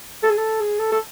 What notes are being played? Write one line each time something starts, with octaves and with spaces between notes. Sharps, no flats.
A4
G#4
A4
G#4
A4
A4